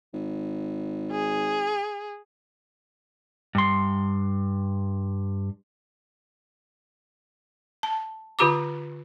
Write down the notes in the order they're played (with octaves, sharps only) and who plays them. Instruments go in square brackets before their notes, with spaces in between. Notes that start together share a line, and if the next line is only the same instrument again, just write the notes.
[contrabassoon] G#1
[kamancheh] G#4
[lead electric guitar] G2 C6
[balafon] A5
D3 F4 G4 A#5 D6